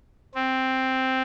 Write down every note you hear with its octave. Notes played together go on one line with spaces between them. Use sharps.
C4